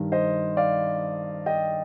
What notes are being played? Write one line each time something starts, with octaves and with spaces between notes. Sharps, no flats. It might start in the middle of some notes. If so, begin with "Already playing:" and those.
Already playing: G2 D#3
C5 D#5
D5 F5
D#5 G5